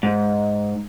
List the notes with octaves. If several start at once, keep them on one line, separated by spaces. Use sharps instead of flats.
G#2